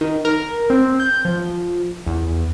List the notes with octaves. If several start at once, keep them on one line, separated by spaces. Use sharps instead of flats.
D#3
A#4
C4
G6
F3
E2